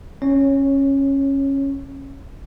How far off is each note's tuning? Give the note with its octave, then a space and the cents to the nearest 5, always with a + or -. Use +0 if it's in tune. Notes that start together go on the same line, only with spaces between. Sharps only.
C#4 -15 C#5 +0